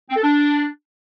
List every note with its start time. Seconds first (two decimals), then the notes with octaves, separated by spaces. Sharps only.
0.10 C4
0.16 A4
0.23 D4